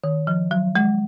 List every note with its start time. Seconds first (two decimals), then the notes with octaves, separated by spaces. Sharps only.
0.04 D#3
0.27 F3
0.51 F#3
0.75 G#3